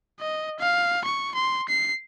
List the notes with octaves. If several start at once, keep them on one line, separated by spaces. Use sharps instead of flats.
D#5
F5
C#6
C6
C7